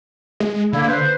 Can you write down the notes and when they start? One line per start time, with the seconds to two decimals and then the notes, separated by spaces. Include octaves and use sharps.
0.40 G#3
0.73 D3 A#3 E4
0.88 B4 C5